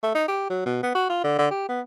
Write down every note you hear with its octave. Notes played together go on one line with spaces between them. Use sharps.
A3
D#4
G4
F#3
B2
B3
F#4
F4
D3
D3
G4
B3